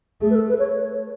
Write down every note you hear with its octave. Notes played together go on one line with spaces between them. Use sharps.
A3 G#4
B4
A4
B4
C#5